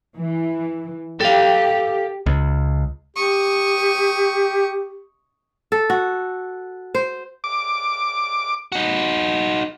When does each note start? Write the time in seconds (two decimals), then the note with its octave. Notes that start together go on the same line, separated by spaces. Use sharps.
0.17 E3
1.20 G4 A4 F5
2.26 C#2
3.16 G4 C#6 D#6
5.72 A4
5.90 F#4
6.95 C5
7.44 D6
8.72 D#4 F#4